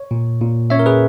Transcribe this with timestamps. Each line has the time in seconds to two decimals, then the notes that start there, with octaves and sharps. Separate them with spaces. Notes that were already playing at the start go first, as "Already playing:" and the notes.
Already playing: C#5
0.11 A#2
0.41 A#2
0.70 C#4 C#5 E5
0.79 A#4
0.86 G#4 B4